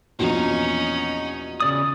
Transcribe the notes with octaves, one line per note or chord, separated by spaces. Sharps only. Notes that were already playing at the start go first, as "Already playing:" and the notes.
A#1 E2 B2 C#4 D#4
C#3 D5 D#6